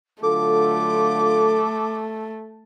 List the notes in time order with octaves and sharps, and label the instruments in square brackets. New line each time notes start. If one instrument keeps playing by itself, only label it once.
[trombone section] D3 F#3 F4 [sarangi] A3 [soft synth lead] A4 [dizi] D6